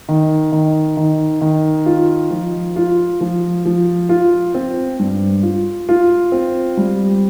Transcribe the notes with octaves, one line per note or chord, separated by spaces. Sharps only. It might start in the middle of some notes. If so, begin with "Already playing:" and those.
D#3
D#3
D#3
D#3
F4
F3
F4
F3
F3
F4
C4
G2
F4
F4
C4
G3